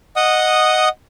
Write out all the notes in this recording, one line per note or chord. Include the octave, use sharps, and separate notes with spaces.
D#5 F#5 D#6